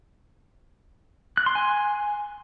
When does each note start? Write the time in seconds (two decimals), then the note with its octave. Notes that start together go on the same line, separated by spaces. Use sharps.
1.37 F#6
1.46 C6
1.55 G#5